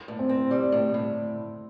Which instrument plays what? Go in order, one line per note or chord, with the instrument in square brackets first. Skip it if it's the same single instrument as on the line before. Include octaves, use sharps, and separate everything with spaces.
[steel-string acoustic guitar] A2
[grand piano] C4
[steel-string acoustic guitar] C4
G3
A2
A2